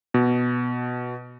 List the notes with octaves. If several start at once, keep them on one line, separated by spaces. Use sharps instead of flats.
B2